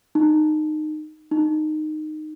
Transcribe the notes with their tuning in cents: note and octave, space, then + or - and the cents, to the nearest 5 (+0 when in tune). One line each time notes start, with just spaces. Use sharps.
D#4 -20
D#4 -15